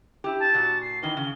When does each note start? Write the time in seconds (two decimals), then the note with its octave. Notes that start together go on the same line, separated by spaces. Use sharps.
0.24 E4 G4
0.40 A5
0.54 A#2 F#4
0.81 C7
1.03 D#3 E3 G7
1.17 C#3